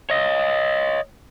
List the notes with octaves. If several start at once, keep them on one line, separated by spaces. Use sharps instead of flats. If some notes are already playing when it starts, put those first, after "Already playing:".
C#5 D#5